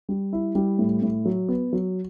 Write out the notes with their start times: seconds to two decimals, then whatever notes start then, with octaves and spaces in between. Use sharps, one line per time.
0.09 G3
0.33 E4
0.55 G3
0.79 A2
1.02 A2
1.25 F#3
1.48 B3
1.73 F#3